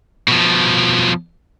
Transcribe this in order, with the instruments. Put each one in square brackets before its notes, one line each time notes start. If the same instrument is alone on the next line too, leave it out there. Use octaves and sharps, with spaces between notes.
[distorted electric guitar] B2 F3